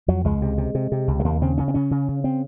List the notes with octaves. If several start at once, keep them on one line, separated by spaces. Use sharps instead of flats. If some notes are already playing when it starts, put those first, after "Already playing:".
F2 F#3
C#2 G#3
C3
C3
C3
C3
C#2
G#3
D#2 A#3
C#3 C4
C#3 C#4
C4
C#3 C#4
C#3
C#3
C4